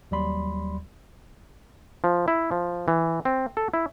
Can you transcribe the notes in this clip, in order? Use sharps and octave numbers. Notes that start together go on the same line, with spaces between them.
D#2 F#3 G3 D5 B5 C6
F3
E4
F3
E3
C4
A4
E4